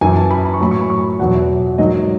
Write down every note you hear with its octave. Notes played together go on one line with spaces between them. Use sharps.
F#2 E3 G#5
A5
B5
B5
C#6
A2 F#3 B5
C#6
B5
C#6
B5
E2 B2 F#3 F#5
E5
G#2 D#3 F#3 D#5